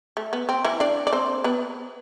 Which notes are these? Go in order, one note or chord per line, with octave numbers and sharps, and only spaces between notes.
A3
B3
C4
E3 E4
D4 D5
D5
C4 C5
B3 B4